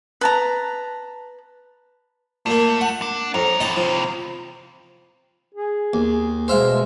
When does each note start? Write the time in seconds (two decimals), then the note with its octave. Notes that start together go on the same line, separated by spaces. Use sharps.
0.21 B4 A5 A#5
2.46 A#2 A3 A#3
2.81 F#5
3.02 D4
3.34 F2 C#5 A#5
3.60 C3 E3 D#4 D#5 A5
3.76 F3
5.54 G#4
5.93 D#2
6.48 B2 G#3 C5 E5 F5